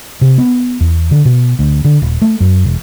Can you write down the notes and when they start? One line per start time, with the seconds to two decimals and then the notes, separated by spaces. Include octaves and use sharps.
0.21 C3
0.38 B3
0.81 E2
1.11 D3
1.25 B2
1.59 D2
1.85 D3
2.02 D#1
2.22 A3
2.40 F#2
2.64 E1